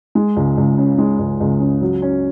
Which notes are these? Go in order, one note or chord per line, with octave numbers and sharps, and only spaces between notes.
G#3
C#2
C#2
C#3
G#3
C#2
C#2
C#3
F#3
C#4